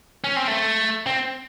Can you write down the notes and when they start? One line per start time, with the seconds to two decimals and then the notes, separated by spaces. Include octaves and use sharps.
0.24 C#4
0.36 C4
0.48 A3
1.07 C4